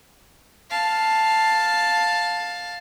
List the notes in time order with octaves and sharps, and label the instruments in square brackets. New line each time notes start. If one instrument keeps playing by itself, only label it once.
[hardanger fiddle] F5 A5